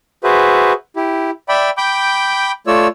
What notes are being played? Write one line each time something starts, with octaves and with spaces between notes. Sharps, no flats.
F#4 G#4 B4 C5 E5
E4 G4
D5 E5 G5 B5
G5 B5 D6 G6
A3 F4 C#5 D5 E6